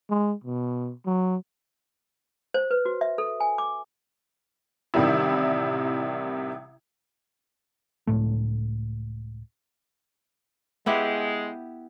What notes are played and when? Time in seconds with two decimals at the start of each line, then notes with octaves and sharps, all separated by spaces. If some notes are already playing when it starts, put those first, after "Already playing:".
0.10 G#3
0.44 B2
1.06 F#3
2.54 C5
2.71 B4
2.85 F#4
3.01 E5
3.18 A4
3.40 G#5
3.58 D6
4.94 A1 C3 D#3 G3 E4
8.07 C#2 A2 A3
10.86 G#3 B3 E4 G4